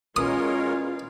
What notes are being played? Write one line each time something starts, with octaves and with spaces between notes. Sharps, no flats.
E2 B2 G#3 C#4 F4 A#4 C#5 D#6